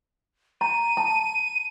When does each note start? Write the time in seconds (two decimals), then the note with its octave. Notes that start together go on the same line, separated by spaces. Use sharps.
0.61 A#5 D#7
0.97 A5